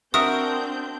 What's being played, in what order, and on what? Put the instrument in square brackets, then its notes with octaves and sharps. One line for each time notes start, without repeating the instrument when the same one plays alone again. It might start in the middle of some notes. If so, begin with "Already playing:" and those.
[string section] C4 D4 G6 [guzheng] F#4 A#4 E5 [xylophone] D#6